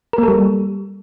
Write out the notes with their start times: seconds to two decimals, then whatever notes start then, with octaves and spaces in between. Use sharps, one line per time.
0.13 A#4
0.18 A#3
0.23 A4
0.28 G3